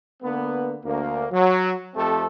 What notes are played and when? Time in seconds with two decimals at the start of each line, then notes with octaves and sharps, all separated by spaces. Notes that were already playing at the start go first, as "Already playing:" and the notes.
0.22 D3 A#3 B3
0.84 D2 A#3
1.31 F#3
1.94 F2 A3 C4 G4 A4